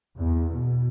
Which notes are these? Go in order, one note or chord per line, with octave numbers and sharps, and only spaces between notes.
E2
B2